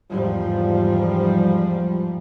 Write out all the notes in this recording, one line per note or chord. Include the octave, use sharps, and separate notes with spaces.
E2 G#2 F3 G3